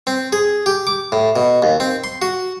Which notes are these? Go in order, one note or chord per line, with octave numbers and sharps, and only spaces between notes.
C4
G#4
G4
D6
A2
B2
D#2
C4
C6
F#4